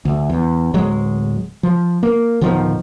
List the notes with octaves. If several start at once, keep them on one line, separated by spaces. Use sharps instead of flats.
D2
E2
D1 F#3 G#3
F3
A#3
D1 B2 D#3 F3